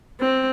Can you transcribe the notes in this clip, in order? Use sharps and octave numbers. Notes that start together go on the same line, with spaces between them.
C4